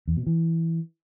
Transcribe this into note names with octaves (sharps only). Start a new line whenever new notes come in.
E2
B2
E3